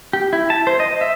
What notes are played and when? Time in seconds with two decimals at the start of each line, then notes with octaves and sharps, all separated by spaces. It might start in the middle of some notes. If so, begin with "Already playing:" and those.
0.13 G4
0.33 E4
0.50 A5
0.67 C5
0.80 D#5
1.01 E5